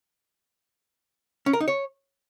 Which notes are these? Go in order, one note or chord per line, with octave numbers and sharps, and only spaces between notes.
C#4
A#4
D#4
C#5